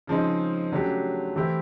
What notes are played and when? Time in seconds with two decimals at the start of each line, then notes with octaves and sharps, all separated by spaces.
0.07 C#3 F3 G#3 C4 D#4
0.72 C#3 F#3 A3 D4 G4
1.36 E3 A3 C4 E4 G4